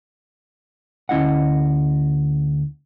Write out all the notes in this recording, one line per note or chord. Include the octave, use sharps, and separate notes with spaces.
D2 C#4 E4 D#5 F#5